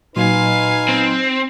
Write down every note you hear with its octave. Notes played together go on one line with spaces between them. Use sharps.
A#2 F#3 D#4 B4 F5 G#5 C6
C4